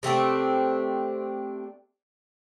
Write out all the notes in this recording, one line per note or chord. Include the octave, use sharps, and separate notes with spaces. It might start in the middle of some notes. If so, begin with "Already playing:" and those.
C3 A3 C4 D4